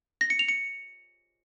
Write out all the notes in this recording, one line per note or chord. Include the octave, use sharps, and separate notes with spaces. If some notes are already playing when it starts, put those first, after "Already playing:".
A#6
C#7
F7
C#7